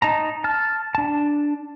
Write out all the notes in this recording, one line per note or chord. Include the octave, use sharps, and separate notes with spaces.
D#4 A5 A#5
A5 F6
D4 A5